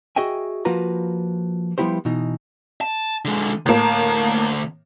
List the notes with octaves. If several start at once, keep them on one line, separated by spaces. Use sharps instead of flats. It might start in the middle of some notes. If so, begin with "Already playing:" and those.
F#4 G#4 D#5 E5 G5 G#5
F3 A#3 F4 F#4 B4 A#5
F3 G3 B3 E4 G4 C5
B2 E3 D#4
A5
D3 G#3
D2 A2 A#3 A5